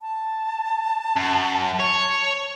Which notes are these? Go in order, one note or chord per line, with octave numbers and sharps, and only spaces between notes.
A5
F#2
C#5